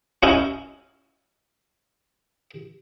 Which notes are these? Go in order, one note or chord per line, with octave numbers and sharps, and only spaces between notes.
C#4 D#4 E4